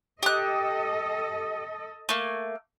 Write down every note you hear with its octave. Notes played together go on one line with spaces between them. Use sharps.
G4 A4 D#5 F#6
A3 A#3